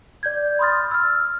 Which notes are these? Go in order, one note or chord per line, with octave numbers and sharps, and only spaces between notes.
D5 G6 G#6
B5 C6 D#6 F6 A6
E6 F6